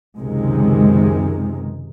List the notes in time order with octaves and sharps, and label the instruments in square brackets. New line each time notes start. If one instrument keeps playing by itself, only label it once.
[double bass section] C#2 F#2 C3 D#3 G#3